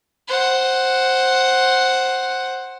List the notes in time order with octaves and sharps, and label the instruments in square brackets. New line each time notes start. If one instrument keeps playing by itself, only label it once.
[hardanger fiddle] C5 F#5